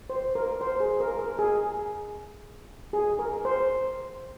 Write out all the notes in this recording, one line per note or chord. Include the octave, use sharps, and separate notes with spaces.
C5
A#4
C5
G#4
A#4
A#4
G#4
G#4
A#4
C5